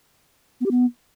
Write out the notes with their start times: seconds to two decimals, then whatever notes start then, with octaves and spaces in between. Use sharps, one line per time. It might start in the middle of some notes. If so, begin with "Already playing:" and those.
0.61 B3
0.66 G4
0.71 B3